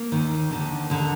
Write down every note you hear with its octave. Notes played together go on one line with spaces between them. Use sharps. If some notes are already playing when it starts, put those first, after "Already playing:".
Already playing: A#3
D#2 D#3
D#2 D3
D#2 D3